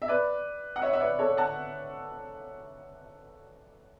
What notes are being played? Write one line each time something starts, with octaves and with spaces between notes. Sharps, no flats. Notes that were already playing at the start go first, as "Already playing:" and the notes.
E5
B4 D5
F#5
C#5 E5
E5
B4 D5
A4 C#5
F#5 A5